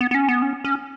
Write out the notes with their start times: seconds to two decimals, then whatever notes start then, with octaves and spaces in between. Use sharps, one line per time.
0.01 B3
0.11 B3
0.15 C#4
0.29 B3
0.42 C#4
0.64 C#4